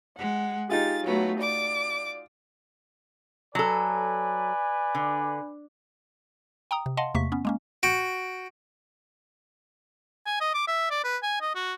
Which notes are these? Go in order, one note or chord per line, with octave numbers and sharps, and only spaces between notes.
G#3 F#5
D#4 F4 G4 G#4 A6
F#3 A3 B3
D5 D6
F#3 A4 B4 D5 G#5
D3
G5 A#5 D#6
C3
D#5 F5 F#5 A5 C6
E2 C3 A3 A#3 C#6 B6
B3 C#4
G#3 A#3 C#4
F#4 G5
G#5
D#5
D6
E5
D5
B4
G#5
D#5
F#4